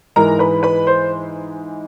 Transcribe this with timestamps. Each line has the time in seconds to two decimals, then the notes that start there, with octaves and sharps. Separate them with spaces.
0.16 G#2 E3 G#3 A#4 A#5
0.39 B4 B5
0.63 B4 B5
0.87 C5 C6